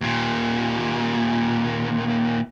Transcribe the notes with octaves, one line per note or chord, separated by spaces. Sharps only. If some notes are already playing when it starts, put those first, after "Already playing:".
D#2 A#2